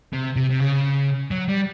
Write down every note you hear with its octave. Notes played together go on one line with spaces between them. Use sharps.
C3
C3
C3
C#3
F#3
G3